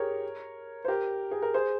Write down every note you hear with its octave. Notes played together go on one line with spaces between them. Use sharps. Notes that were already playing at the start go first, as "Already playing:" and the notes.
Already playing: G4 G#4 A#4 C#5
C5
G4 A#4
G#4
A#4
G#4 C5